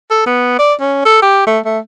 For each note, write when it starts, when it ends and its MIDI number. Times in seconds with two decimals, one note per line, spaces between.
0.11 0.22 69
0.26 0.58 59
0.59 0.74 74
0.81 1.04 61
1.05 1.22 69
1.22 1.42 67
1.47 1.60 57
1.65 1.79 57